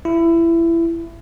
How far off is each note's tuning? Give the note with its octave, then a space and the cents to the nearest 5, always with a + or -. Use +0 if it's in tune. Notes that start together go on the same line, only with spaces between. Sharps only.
E4 +20